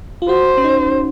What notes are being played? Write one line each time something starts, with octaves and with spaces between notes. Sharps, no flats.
F4
F#4 C5
C#4
D#4